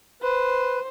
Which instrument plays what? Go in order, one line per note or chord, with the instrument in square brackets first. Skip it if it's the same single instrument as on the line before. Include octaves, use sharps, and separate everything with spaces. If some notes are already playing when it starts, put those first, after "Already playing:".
[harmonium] B4 [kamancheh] C5